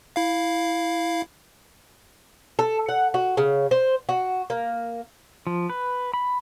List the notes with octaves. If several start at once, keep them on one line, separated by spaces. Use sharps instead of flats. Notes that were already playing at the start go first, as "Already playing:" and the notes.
E4 F5
A4
F#5
F#4
C#3
C5
F#4
A#3
F3
B4
B5